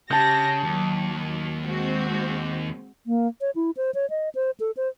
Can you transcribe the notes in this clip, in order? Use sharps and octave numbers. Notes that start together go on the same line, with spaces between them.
C#3 G4 A5 G6 A#6
D#2 F#3
G#3 C4 F#4
A#3
C#5
E4
C5
C#5
D#5
C5
A4
C5